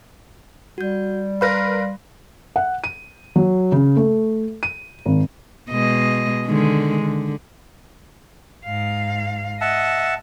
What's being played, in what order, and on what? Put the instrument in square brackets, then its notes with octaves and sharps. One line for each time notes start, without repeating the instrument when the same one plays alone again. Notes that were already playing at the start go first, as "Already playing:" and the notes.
[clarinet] G3 [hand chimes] F#4 G6
[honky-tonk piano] A#4 B4 F5 [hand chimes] B5 C6 A#6
[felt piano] F#5
D#7
F#3
C#3
A3
D#7
G#1
[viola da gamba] B2 G#3 D#5
D3 D#3 G#3
D3
[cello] G#2 F5
[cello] D#5 [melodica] E5 F#5 A5